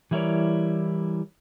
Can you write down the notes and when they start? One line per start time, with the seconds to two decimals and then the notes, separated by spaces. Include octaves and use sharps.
0.11 E3 G3 E4 A#4 C#5 D5